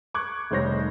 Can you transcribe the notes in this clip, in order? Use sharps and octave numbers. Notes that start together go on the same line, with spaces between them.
C#6 D6 F#6 G#6
F1 D#3 G3 C5 C#5 A#6